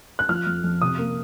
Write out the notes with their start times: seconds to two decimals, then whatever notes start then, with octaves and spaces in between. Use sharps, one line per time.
0.19 F#6
0.29 F3 F6
0.47 F2
0.64 F2
0.82 C3 D#6
0.99 A#3